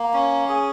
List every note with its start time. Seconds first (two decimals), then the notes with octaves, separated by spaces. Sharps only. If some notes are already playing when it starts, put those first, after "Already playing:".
Already playing: A#3
0.13 C#4
0.49 G#4